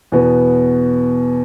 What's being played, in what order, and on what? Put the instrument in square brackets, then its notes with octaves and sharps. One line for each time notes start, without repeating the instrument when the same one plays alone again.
[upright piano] E2 B2 B3